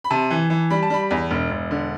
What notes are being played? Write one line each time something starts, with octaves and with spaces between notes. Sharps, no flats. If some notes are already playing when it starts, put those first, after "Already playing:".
B5
C3 A5
E3
E3
G3 B5
A5
G3 B5
E2
E1
E1
D3